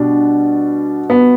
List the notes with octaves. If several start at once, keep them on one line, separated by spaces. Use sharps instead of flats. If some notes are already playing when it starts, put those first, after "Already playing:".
Already playing: B2 G3 D4
B3